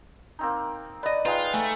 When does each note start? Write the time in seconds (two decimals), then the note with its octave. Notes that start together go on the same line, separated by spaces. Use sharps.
0.39 A#3 C4 D#4
1.03 B4 D5 D#5
1.26 G#3 D#4 F4 B4 F5 G5
1.54 A3 G#5